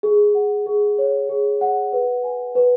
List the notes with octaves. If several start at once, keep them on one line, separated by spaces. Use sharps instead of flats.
G#4
F#5
G#4
C#5
G#4
F#5
B4
G#5
B4